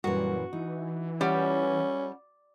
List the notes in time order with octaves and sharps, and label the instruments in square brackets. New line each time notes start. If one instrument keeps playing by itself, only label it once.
[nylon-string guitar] F#2 A#2 E3 [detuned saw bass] G3 [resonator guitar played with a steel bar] F#4
[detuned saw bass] E3 [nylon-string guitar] D#4
[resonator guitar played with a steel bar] G3 [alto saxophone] C#4 [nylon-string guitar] F4 C#5 F#5